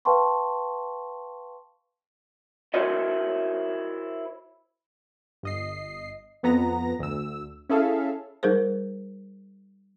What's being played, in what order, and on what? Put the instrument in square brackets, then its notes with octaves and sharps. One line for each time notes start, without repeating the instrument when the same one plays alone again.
[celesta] B4 F5 G5 A5 C6 C#6
[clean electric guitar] E4 F#4 A#4 C5 C#5 D#5
[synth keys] G1 D#5 C7
F2 B3 A#5 A#6
D2 E6
C#4 E4 G#4 A4 E5 F5
[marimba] G3 D#4 G#4 A#4 C5